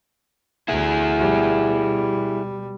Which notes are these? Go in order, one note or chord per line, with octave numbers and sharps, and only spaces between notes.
D2 E4 G#4
B2 G3